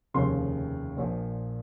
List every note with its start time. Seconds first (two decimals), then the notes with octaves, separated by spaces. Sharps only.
0.14 F1 D#2 C#3 F3 C6
0.96 A#1 A#2 F3